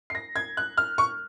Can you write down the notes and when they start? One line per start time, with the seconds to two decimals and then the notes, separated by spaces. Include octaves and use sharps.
0.10 C7
0.15 A#6
0.36 G#6
0.57 F#6
0.77 F6
0.98 C#6